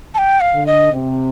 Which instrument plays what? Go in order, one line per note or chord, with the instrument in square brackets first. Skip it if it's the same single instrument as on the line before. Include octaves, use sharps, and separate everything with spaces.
[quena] A5
G5
F5
[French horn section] D3
[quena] D#5
[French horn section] C3